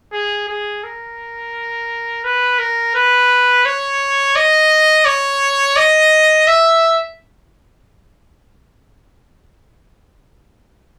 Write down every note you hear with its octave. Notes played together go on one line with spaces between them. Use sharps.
G#4
G#4
A#4
B4
A#4
B4
C#5
D#5
C#5
D#5
E5